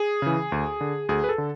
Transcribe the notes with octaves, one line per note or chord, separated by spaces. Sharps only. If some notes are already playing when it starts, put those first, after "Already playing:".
Already playing: G#4
C#3 E3
D2
D3
D2 G#4
B4
A4
D3